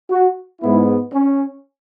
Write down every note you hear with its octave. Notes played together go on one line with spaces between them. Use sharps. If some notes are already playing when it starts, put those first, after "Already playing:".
F#4
G#2 G#3 B3 E4
C#4